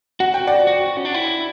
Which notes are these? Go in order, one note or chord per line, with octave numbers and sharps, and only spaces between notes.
F#4 F#5
G5
D5 F#5
F#4
C#4
D4
E4